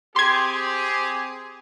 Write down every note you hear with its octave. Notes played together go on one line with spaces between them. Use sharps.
C4 G4 G#4 C6 G#6